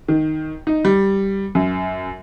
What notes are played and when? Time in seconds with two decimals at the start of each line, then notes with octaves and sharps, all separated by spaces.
0.08 D#3
0.67 D#4
0.85 G3
1.55 F#2